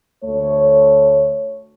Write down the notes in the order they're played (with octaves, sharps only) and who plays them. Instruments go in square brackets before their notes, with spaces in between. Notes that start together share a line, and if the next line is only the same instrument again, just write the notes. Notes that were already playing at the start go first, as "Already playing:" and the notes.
[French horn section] D2 A3 C#5